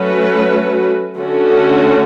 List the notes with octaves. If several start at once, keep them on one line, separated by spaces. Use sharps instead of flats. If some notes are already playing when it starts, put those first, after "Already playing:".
Already playing: F#3 A3 C#4 F#4 B4
D3 A3 C#4 F#4